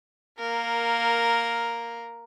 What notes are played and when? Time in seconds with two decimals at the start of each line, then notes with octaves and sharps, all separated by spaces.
0.39 A#3 A#4